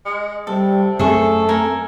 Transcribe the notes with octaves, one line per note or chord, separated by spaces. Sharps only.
G#3
C3 G3 A4
F#2 A3 C4 G#4 A4 E5 C#6
A#4 G#5